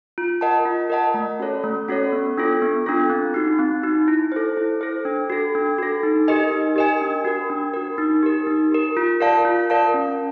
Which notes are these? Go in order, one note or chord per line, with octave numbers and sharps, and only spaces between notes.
F4
A#4 D#5 F#5 A5
F4
A#4 D#5 F#5 A5
A3
C#4 F#4 A4 C#5
A3
C#4 F#4 A4 C#5
B3
D4 F4 A4
B3
D4 F4 A4
C4
D#4 F#4
C4
D#4 F#4
E4
A4 C5
E4
A4 C5
D4
F#4 A4
D4
F#4 A4
D#4
G4 A#4 D#5 G#5
D#4
G4 A#4 D#5 G#5
D4
F#4 A#4
D4
F#4 A#4
D#4
G4 A#4
D#4
G4 A#4
F4
A#4 D5 F5 A5
F4
A#4 D5 F5 A5
C#4